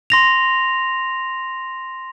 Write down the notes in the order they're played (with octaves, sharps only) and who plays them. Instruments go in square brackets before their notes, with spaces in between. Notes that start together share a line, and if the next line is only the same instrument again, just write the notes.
[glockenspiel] C6 A#6 F7